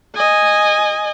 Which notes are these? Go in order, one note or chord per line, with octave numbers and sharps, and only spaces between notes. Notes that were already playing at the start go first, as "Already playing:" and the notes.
D#5 G#5